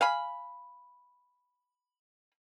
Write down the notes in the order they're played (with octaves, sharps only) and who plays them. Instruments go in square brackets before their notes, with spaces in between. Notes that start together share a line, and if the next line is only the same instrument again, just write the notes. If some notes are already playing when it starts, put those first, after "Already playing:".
[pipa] F5 G#5 B5